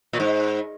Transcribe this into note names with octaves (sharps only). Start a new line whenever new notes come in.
A#2
G#2